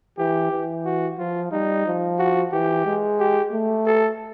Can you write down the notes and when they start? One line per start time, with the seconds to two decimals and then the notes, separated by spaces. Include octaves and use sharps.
0.19 E3 G4
0.52 E3
0.85 F#4
1.19 F3 F4
1.52 G3 D#4
1.86 F3
2.19 F#4
2.52 E3 G4
2.86 G#3
3.20 G4
3.52 A3
3.86 A4